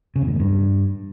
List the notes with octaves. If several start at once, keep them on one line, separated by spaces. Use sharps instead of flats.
C#3
E2
A2
A#2
G2